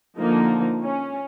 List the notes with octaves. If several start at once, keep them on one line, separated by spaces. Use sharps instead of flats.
D3 F3 A#3 D#4
C#4